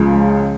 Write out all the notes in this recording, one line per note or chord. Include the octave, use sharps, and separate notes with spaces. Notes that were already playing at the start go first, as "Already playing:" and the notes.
Already playing: C#2 C#3 F3 G#3